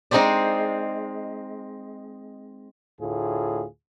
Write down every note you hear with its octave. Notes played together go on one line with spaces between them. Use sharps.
G#3 C4 D#4 G#4 C5 D5
D2 A2 F4 G#4